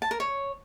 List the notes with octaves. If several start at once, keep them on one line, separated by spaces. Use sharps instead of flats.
A5
A#4
C#5